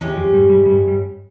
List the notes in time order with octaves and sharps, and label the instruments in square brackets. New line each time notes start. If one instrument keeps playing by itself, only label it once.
[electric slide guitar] E2 E3 [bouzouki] G#3 C#4 G4
[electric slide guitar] F2 F3
G2 G3
G2 G3
G2 G3
G2 G3